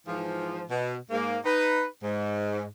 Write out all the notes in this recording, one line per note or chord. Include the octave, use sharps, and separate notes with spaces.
G#2 E3 F3
B2
G#2 A#3
D#4 B4
G#2